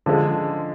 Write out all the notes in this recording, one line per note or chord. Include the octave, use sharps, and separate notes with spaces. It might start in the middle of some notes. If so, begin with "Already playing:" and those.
D3 F3 G#3